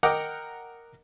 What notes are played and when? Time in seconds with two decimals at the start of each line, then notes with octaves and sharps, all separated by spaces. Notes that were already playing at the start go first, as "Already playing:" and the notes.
0.03 A#4 D#5 F#5 G5 D6